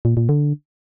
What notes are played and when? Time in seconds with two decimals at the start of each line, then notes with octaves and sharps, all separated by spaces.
0.05 A#2
0.17 A#2
0.29 D3